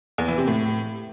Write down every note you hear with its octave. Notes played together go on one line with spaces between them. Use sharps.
E2
E3
C3
A2